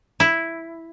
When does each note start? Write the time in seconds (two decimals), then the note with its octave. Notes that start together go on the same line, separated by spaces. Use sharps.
0.20 E4